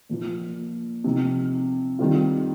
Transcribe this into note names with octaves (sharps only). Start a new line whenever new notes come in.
A#2 F3 A#3 F4
C3 F3 D#4
D#3 G3 C4 F4